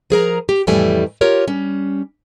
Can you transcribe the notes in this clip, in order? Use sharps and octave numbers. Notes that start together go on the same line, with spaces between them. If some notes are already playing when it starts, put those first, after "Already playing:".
F3 G#4 A#4 A#5
G4
F2 A2 E3 G3 A3 G#5
F4 G4 A#4 C#5
G3 C#4